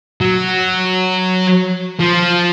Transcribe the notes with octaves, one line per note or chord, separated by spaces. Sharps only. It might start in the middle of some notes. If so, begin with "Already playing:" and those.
F#3
F3